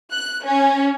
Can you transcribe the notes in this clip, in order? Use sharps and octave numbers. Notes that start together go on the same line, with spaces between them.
F#6
C#4